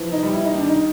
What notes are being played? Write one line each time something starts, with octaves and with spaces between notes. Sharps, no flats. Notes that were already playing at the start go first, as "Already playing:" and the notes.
Already playing: E3 F3
D#4
G3
E4
D#4
D#3 D4
D#4